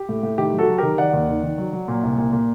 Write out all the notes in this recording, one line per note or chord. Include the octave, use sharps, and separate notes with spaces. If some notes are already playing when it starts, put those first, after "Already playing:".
Already playing: G4
A2
A2
D#3 G4
F#3
F#4 A4
F#3
D#3 G4 A#4
D#3 D5 F#5
D#2
D#3
D#3
F#3
F#3
A#2
C2
A#2
A#2